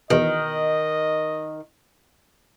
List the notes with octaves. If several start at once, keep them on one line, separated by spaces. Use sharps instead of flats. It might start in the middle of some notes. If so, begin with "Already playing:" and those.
E2 B2 D#3 D#5